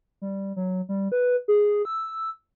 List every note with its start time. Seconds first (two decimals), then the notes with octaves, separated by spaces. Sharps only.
0.22 G3
0.56 F#3
0.89 G3
1.12 B4
1.48 G#4
1.85 E6